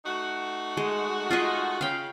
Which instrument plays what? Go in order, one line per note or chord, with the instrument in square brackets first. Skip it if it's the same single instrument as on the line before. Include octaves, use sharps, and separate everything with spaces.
[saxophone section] A3 D#4 F#4
[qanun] G#3
F4 G#4 D#5
[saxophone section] C#3 [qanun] F5 G5